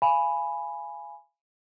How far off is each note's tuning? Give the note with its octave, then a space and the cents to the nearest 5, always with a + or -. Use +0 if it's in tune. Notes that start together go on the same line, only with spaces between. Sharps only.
F5 -25 G#5 +0 B5 +0